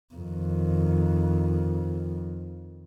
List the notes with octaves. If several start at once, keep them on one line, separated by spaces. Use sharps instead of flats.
F2 D#3